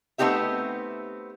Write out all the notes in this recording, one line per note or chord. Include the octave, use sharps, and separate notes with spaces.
A3 B3 C4 D#4 G4 E5